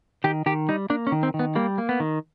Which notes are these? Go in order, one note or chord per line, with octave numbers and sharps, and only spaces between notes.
D#3 G4
D#3 G4
G3 D#4
A#3 D4
C#4
D#3
C4
D#3
B3
G3 A#3
A#3
B3
D#3